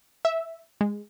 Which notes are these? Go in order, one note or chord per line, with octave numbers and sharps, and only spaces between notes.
E5
G#3